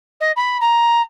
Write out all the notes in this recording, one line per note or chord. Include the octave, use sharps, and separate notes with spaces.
D#5
B5
A#5